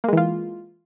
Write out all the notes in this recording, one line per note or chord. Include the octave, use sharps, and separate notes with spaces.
E3 G#3 A#3 F4